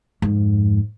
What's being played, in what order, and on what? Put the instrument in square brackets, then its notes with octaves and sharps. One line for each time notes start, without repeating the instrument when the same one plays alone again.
[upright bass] F2 G#2